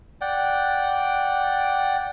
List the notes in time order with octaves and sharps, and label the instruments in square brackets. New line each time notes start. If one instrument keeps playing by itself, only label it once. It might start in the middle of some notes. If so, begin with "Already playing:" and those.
[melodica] D5 F#5 G5